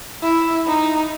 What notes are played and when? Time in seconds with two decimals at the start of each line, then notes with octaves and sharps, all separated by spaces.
0.23 E4
0.67 D#4